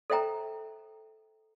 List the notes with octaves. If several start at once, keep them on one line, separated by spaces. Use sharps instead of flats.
A4 C5 E5 G5 A#5